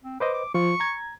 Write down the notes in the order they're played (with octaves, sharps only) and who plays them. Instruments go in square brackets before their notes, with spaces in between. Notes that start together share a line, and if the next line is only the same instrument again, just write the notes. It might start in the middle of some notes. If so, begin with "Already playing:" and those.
[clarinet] C4
[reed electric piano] B4 C5 D#5 [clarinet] D6
[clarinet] D6
[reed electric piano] F3 F4 [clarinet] C#6
[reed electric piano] A#5 G#6